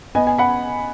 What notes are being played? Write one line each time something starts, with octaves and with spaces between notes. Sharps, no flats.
B3 D#5 G#5
G#5
F#5 B5